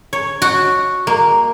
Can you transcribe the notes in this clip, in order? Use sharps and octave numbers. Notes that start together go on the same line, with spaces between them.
C#5
F#4
A#3